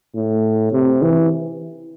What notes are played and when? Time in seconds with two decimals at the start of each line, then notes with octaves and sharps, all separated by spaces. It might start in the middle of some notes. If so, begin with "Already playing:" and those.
0.15 A2
0.73 C3
1.02 E3